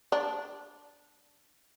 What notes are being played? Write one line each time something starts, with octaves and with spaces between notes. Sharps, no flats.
D4